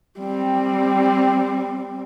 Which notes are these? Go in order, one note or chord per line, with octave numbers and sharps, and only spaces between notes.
G3 C4